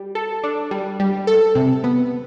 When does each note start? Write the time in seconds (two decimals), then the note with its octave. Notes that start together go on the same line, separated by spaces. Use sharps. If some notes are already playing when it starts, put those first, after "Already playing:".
Already playing: G3
0.15 A4
0.43 D4
0.71 G3
1.00 G3
1.27 A4
1.55 C3
1.84 B3